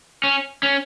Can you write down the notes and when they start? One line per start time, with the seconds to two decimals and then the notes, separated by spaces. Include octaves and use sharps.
0.24 C#4
0.63 C#4